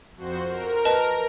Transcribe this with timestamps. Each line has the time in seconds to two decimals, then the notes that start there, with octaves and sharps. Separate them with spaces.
0.16 F2 F#4 C5
0.48 A#4
0.85 B4 D#5 A5